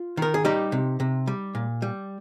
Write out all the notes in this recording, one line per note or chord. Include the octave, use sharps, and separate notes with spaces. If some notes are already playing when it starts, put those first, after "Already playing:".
Already playing: F4
D#3 A#4
G#4
G3 D#4 G4
C3
C3
G3
A#2
G3